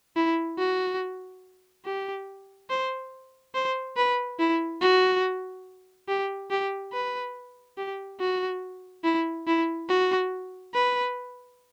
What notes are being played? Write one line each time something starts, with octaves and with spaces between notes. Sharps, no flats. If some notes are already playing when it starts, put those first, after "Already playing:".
E4
F#4
G4
C5
C5
B4
E4
F#4
G4
G4
B4
G4
F#4
E4
E4
F#4
B4